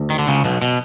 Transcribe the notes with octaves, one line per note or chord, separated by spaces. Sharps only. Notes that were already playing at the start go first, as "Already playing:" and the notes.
Already playing: D2
D#3
D3
C#2 C#3
B1 B2
B2